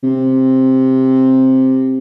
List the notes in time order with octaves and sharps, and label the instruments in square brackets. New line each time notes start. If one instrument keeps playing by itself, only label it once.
[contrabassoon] C3